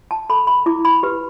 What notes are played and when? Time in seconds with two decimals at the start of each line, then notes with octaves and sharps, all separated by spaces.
0.11 A5
0.29 A4 B5
0.47 B5
0.66 E4 D6
0.85 B5
1.03 G4 B4